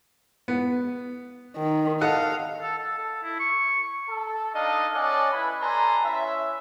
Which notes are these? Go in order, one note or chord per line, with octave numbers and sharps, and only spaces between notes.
B3
D#3
A4 D#5 F5 F#5
A4
A4
A4
E4
C#6
A4
D4 D#4 A4 D#5 F5 A5
C#4 A4 D5 D#5 F#5 G#5
E4 B4 G#5 B5
G3 A4 B4 G#5 A#5 C6
C#4 E4 B4 E5